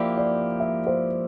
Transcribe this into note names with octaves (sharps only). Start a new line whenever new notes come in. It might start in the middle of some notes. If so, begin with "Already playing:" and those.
Already playing: F3 A#3 E4 G4 D5
D5
E5
C5